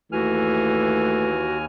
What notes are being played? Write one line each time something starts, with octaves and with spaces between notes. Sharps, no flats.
D#2 E3 A3 F#4 G#5 F6